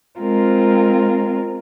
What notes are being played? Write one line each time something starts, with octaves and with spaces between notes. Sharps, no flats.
G#3 C4 F4 A#4